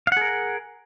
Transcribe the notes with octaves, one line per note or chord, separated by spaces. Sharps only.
G#4 A#4 F5 F#5